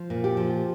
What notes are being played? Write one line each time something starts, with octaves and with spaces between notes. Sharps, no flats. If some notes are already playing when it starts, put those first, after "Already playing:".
Already playing: F3
A#2
G4
F3